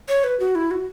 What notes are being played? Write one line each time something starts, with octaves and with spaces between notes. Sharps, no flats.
C#5
B4
F#4
E4
F#4